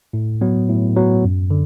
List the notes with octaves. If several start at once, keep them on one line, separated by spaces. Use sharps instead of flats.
A2
F#3 B3
A2
F#3 B3
F#2
D3